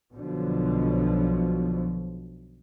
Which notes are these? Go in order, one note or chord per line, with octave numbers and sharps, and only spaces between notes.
B1 B2 D3 F3